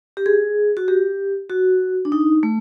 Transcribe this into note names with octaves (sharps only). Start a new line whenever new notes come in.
G4
G#4
F#4
G4
F#4
D4
D#4
A3